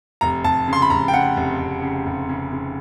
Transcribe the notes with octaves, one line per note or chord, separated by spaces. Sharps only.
F1 A#5
F1 A5
C#3 C6
B5
F1 A#5
G5
C#3 F#5
F1
F1
C#3
F1
C#3
C#3